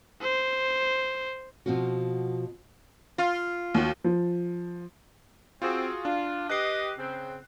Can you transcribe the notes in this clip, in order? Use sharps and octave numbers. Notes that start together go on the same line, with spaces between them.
C5
B2 F3 C4 F4 F#4
F4
D#2 F#4
F3
C4 F4 F#4 G#4
D4 F4
G4 B4 D#5 F#6 C7
C#3 C4